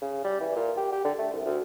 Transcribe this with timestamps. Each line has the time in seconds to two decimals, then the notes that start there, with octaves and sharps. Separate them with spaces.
0.02 C#3
0.25 G3
0.41 E3
0.56 A#2
0.78 G4
0.92 G4
1.04 D3
1.19 A3
1.33 C2
1.46 D2